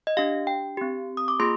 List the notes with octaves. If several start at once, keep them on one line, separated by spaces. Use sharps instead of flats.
D#5
D4 G4 F5
G5
C4 G4
D#6
D6
A#3 F4 G#4 C6